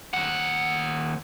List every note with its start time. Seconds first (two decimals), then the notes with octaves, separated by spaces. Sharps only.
0.14 D#2 F#5